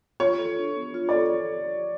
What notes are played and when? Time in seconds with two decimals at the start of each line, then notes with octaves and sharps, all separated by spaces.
0.20 F4 C#5
0.39 A4
0.58 D4
0.76 B3
0.94 F4
1.09 A4 D5